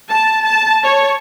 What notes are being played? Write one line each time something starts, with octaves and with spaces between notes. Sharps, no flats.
A5
A5
C#5